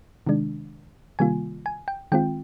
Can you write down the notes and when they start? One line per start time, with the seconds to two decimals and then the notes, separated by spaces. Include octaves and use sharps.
0.27 C3 D#3 G#3 D4
1.19 C3 D#3 G3 A#3 F4 G#5
1.66 G#5
1.88 G5
2.12 D#3 G#3 C4 F4 G5